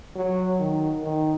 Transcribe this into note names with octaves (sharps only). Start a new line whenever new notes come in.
F#3
D#3
D#3